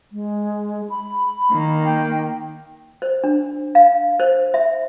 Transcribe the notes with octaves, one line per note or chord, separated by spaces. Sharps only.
G#3
B5
D#3 A#3
G5
C5
D4
F5
C5
E5